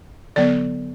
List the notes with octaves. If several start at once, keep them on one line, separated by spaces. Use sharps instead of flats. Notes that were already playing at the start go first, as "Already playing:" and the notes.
D3 F#3 B3 D5